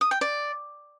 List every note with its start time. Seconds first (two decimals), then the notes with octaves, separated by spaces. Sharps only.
0.01 D#6
0.11 G5
0.21 D5